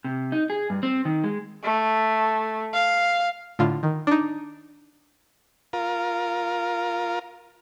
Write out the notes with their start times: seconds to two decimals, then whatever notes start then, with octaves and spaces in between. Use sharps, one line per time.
0.05 C3
0.32 D#4
0.50 G#4
0.70 G2
0.83 C4
1.05 D#3
1.24 G#3
1.63 A3
2.73 F5
3.59 A2 D3 F4
3.83 D#3
4.07 D4 D#4
5.73 F4 A#4